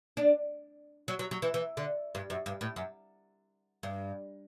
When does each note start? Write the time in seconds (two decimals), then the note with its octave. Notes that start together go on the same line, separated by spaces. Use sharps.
0.17 D4
1.08 F#3
1.19 F#3
1.31 F#3
1.42 E3
1.54 E3
1.77 D3
2.15 G2
2.30 F#2
2.46 G2
2.61 A2
2.76 F#2
3.83 G2